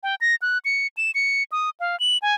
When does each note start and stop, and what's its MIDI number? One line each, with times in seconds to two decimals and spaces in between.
0.03 0.15 79
0.21 0.35 94
0.42 0.58 90
0.65 0.87 97
0.97 1.11 100
1.15 1.43 97
1.52 1.70 87
1.80 1.98 77
2.00 2.18 102
2.22 2.35 80